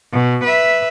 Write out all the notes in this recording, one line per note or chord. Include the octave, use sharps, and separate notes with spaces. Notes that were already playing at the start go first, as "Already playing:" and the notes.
B2
B4 E5